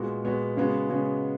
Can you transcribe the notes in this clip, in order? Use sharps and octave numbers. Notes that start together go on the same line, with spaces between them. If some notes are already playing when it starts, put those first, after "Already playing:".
Already playing: A#2 G#3 B3 F#4
A#2 G#3 B3 F#4
C#3 G#3 B3 F#4
C#3 G#3 B3 F#4